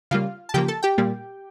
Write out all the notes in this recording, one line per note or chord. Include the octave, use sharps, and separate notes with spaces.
C#3 G3 A#3 F4 F5
A5
C#3 F3 A#3 G4 G5
A4 A5
G4 G5
A#2 G3 A#3